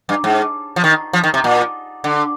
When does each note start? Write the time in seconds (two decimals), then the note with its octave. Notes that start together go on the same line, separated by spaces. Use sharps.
0.09 G2
0.24 G#2
0.76 F3
0.84 D#3
1.13 F3
1.24 D#3
1.34 C3
1.44 A#2
2.04 D3